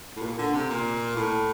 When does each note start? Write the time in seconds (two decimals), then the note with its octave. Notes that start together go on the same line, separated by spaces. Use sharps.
0.16 A2
0.22 A#2
0.39 D3
0.54 C3
0.70 A#2
1.16 A2